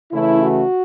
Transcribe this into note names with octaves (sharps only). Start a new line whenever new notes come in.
C#3 E3 A3 C#4 E4
F#4